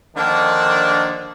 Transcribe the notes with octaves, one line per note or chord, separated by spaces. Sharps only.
D3 D#3 F3 A#3 D4